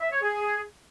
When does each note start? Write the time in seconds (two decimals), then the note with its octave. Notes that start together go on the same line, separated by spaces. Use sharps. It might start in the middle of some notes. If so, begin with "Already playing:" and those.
0.01 E5
0.11 C#5
0.22 G#4